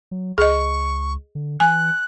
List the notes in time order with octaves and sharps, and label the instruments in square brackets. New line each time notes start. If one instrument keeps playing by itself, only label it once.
[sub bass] F#3
[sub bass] C#2 [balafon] G#4 D#5 [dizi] C#6
[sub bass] D3
[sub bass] E3 [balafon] G#5 [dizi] F#6